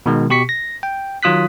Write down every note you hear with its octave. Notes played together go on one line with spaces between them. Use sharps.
B2 D#3 G#3
B2 G4 C#6 B6 C#7
A#6
G5
D#3 F#3 F4 D#6 F#6 B6